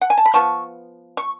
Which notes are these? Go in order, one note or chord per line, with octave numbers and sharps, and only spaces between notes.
F#5
G#5
A5
B5
F3 B3 F4 A5 C#6
C#6